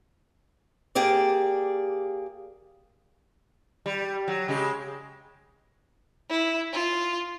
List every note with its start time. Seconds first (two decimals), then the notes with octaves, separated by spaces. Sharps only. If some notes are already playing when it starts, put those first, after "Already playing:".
0.95 A#3 G4 G#4 D5
3.86 G3
4.28 F#3
4.48 C#3 G#3 G4
6.30 E4
6.73 F4